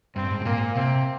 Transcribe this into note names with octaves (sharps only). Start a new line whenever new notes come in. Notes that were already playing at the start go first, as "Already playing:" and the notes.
G2 C4
G#2
C3
A#2 A#3
C3 C4